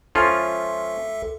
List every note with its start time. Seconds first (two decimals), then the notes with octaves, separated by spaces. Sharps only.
0.15 C#2 F3 C#4 F4 A4 E5